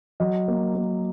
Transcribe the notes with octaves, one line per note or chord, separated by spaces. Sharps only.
F#3 D#5
A#3
A#3